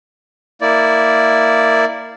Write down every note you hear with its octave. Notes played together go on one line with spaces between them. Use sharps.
A#3 E4 D5